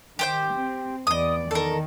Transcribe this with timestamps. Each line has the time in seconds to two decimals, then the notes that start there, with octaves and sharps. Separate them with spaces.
0.19 D#3 G4 C5 G5
0.53 C4
1.07 E2 B3 D5 D#5 D#6
1.51 D#3 A4 A#4